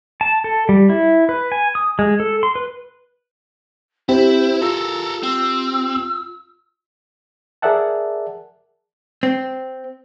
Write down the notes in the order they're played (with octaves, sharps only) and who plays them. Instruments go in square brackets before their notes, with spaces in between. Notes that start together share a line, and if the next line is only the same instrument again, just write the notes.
[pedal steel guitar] A5
A4
G3
E4
B4
G#5
D#6
G#3
A4
C6
B4
[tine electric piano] C4 [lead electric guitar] E4 [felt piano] G4 [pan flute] C5
[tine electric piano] F4 [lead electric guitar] A4 A#4 [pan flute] E6
[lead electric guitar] C4 [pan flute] E6
[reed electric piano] G#4 A#4 D5 E5 F#5 A5
[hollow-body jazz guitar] C4